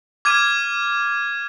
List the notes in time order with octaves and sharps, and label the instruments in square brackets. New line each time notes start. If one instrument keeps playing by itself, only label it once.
[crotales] D6 F6 G#6 D#7